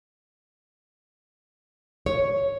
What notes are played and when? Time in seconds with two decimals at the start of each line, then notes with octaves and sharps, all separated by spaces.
2.06 C#5